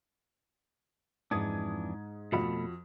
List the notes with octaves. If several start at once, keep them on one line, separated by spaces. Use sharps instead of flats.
F2 G#2 E3 D4 D#6 G#6
F2 B2 A3 F#4 B5